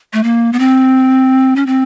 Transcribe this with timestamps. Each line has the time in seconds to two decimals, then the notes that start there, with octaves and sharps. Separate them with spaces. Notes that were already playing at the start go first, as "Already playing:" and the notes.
0.13 A3
0.24 A#3
0.53 B3
0.59 C4
1.56 C#4
1.67 C4